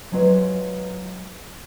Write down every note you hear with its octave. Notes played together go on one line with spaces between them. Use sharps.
F#3 G#3 F4 B4 D#5